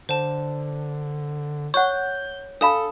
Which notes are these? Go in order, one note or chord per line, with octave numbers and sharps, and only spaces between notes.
D3 C5 A5
C#5 F#5 C#6 F#6 G6
D4 A4 F5 A5 B5 D#6